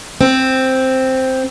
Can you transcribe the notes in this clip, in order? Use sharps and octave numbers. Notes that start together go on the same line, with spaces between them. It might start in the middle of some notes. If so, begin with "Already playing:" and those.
C4